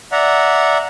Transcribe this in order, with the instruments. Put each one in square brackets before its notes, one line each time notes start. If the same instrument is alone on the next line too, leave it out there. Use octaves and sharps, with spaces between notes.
[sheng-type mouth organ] D5 E5 F#5 A#5